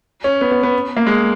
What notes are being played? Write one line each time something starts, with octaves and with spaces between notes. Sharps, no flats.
C#4
B3
B3
B3
A#3
G#3